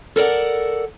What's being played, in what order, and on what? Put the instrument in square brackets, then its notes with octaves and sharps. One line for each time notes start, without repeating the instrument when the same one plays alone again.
[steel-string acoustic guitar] A4 A#4 D5 F#5